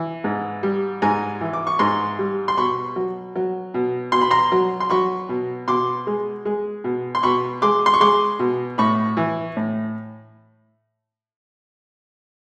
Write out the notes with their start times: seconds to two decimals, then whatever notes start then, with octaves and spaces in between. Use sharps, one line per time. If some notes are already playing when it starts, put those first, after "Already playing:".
Already playing: E3
0.24 G#2
0.63 G3
1.02 G#2 G#5 A#5
1.41 E3
1.53 D6
1.67 C#6
1.79 G#2 A#5 C6
2.19 G3
2.48 C6
2.57 B2 B5 C#6
2.96 F#3
3.36 F#3
3.74 B2
4.12 B2 C6
4.21 B5
4.31 A#5 C6
4.52 F#3
4.80 C6
4.90 F#3 B5 C#6
5.29 B2
5.68 B2 C6 D6
6.07 G#3
6.45 G#3
6.84 B2
7.15 C6
7.23 B2 B5 C#6
7.62 G#3 C6 D6
7.86 C6
7.94 C#6
8.00 G#3 C6 D6
8.39 B2
8.78 A2 B5 C#6
9.17 E3
9.57 A2